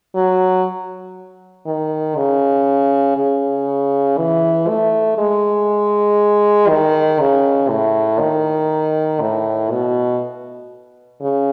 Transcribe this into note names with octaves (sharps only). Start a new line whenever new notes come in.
F#3
D#3
C#3
C#3
E3
A3
G#3
D#3
C#3
A2
D#3
A2
B2
C#3